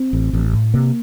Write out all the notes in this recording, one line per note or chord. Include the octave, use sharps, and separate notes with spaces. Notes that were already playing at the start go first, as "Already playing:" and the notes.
Already playing: C4
A1
A1
A2
C3 A#3